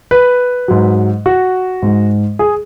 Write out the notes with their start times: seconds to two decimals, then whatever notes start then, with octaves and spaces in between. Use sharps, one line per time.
0.11 B4
0.68 G#2 F#3
1.26 F#4
1.82 G#2 G#3
2.39 G#4